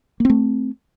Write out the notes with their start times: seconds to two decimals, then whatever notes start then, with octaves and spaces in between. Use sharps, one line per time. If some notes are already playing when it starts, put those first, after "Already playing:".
0.20 A#3
0.25 C4
0.30 A3